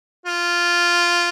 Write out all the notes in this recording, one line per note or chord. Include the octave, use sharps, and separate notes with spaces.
F4